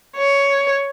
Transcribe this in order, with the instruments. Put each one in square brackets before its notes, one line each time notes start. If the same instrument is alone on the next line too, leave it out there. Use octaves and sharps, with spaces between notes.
[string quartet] C#5